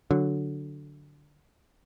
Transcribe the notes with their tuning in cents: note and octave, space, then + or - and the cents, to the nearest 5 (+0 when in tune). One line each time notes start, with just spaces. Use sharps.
D3 +0 F#3 +0